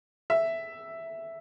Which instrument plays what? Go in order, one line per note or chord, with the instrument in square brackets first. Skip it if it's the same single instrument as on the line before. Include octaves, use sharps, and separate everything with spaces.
[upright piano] E5